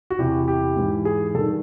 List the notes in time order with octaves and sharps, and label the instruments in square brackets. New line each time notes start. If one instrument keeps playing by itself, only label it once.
[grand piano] F#4
E2 C3 E3 G4
G4
G#2 E3
G#4
G2 D#3 A4